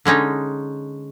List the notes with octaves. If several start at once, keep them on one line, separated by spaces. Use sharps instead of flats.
D3 G#3 C#4 D#4